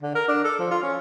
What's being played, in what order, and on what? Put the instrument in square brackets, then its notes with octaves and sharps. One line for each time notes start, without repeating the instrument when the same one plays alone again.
[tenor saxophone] D3
A#4
D4
A4
F3
F4
C#4